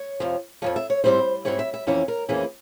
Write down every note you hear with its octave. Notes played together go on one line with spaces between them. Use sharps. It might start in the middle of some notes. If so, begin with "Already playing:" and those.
Already playing: C#5
F2 C3 F3
F2 C3 F3 C#5
E5
C#5
G#2 G3 C4 E4 C5
G#2 G3 C4 E4 C#5
E5
E5
F2 E3 A#3 C#4 E4 C#5
A#4
F2 E3 A#3 C#4 E4 G#4